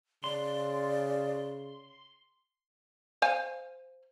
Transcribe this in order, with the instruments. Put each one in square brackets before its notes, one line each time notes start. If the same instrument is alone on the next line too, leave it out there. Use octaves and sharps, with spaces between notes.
[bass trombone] C#3 [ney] D5 [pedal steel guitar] C6
[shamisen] C5 F5 G#5